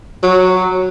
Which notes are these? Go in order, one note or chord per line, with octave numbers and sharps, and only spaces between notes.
F#3